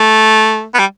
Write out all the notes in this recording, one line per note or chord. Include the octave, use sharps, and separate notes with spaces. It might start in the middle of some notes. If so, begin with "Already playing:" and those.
Already playing: A3
B3
G3